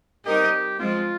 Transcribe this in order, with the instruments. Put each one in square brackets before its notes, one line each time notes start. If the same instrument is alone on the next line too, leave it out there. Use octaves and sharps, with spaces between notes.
[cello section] G3 C4 D#4 A#4 D#5 [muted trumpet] G4
[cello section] F3 G#3 C4 [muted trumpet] F4